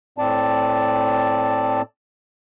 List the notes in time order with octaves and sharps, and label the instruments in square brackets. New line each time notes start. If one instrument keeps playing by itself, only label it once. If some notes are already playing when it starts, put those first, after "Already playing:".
[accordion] A2 C4 D5 A5